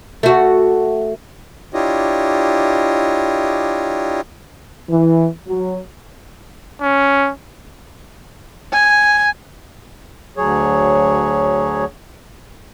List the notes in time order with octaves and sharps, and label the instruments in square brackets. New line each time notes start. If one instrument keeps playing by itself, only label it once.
[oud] A3 F#4
[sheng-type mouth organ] D4 E4 F4 G4 C#5 D#5
[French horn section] E3
F#3
[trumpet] C#4
[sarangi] G#5
[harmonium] D2 F#3 G#4 C#5